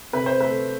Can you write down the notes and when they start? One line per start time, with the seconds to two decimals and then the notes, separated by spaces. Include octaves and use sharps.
0.13 C3 B4
0.26 C5
0.40 A3 B4